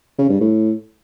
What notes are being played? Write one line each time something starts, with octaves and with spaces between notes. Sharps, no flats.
C#3
G2
A2